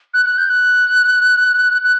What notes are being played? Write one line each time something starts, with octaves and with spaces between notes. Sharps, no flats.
F#6
F#6
G6
F#6
F#6